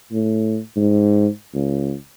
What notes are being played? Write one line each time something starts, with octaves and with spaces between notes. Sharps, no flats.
A2
G#2
C#2